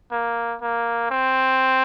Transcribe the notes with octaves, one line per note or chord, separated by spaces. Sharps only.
A#3
A#3
C4